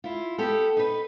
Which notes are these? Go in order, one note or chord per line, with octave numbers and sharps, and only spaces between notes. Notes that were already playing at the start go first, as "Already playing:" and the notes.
E4 F4
B3 G4 A4
D#4 B4